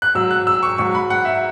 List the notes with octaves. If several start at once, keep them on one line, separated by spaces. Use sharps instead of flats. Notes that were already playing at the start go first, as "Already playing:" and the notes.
F#6
G#2 F#3 E6
F#6
E6
C#6
G#2 F#3 C#6
B5
F#5
E5